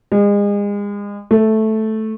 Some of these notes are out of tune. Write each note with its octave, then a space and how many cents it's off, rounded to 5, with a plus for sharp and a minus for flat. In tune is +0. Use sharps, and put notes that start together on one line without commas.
G#3 -35
A3 -5